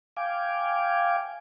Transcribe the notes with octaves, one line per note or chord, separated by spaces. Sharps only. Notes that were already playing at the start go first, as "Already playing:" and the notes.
F5 G5 G#5 D6